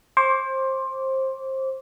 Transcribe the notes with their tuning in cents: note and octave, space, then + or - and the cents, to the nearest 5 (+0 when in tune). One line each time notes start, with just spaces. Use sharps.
C5 +25 D6 -30